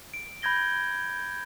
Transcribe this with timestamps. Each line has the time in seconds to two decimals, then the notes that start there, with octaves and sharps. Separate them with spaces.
0.14 D7
0.42 B5 G6 G#6 A#6 G7